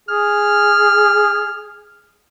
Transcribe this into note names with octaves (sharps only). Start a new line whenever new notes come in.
G#4 F6